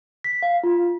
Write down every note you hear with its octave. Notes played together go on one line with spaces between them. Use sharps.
B6
F5
F4